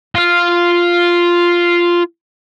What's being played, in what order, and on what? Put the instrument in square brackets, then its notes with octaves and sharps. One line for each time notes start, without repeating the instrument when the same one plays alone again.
[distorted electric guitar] F4 F5